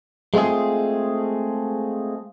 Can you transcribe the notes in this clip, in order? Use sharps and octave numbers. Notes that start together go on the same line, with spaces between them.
G#3 A3 C4 F4 G#4